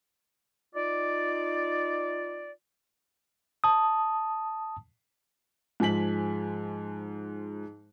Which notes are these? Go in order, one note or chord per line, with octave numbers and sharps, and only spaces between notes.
D#4 F4 D5
A5 D#6
G#2 F3 G#3 G#5 B6 F#7